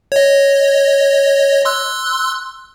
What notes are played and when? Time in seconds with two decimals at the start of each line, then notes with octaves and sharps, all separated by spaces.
0.12 C#5 D#5
1.65 C6 E6 F#6